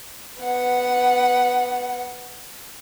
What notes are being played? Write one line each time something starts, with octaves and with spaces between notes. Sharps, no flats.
B3 F#5